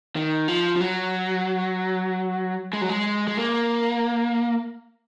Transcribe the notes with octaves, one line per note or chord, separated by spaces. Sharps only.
D#3
F3
F3
F#3
G#3
F#3
G#3
G#3
A#3